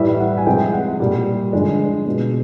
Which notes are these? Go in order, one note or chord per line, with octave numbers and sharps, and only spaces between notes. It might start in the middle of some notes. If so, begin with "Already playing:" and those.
Already playing: A2 E3 G3 E5
F#5
G#5
C3 F3 G#3 G5
F#5
A#2 G3
D3 F3 G#3
B2 G#3